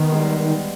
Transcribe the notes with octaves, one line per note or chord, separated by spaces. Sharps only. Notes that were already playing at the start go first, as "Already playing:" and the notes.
Already playing: D#3 B3
G#3
G3